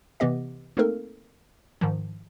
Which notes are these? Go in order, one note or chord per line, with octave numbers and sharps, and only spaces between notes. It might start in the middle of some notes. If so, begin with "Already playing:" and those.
C3 E3 B3 G4 D#5
A3 A#3 C4 D#4 A4 A#4
G#2 D#3 F3